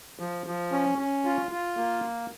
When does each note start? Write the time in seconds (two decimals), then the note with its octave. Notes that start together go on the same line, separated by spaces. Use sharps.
0.19 F3
0.46 F3
0.72 C#4
0.99 C#4
1.25 F4
1.51 F4
1.77 A#3